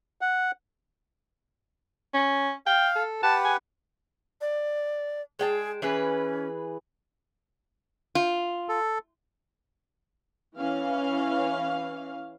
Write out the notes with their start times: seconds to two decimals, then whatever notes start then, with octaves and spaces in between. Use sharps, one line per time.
0.21 F#5
2.14 C#4
2.66 F5 G5
2.96 A4
3.23 G4 B4 F#5 A5
3.44 G#5
4.41 D5
5.39 G#3 G#4 G5 A5
5.82 E3 C#4 G#4 B4
8.15 F4
8.69 A4
10.58 E3 C#4 F5